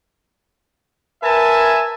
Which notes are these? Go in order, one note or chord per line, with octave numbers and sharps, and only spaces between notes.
A#4 B4 E5 G#5 A5